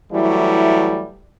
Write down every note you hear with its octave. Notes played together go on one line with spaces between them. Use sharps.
E3 F#3 G3 A3 E4